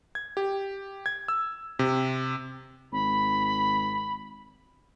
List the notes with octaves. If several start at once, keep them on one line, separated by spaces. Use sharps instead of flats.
G#6
G4
G#6
E6
C3
G#1 B5